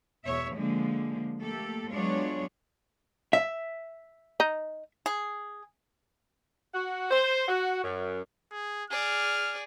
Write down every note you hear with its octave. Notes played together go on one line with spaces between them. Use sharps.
E2 B2 C#5 E5
D3 F3 G#3 A#3
A3 A#3 G4 A4
F#3 G#3 B3 D4 F4 C#5
E5
D#4
G#4
F#4
C5
F#4
F#2
G#4
G#4 D5 F6